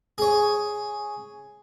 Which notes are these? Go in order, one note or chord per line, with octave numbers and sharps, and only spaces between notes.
G#4 C#5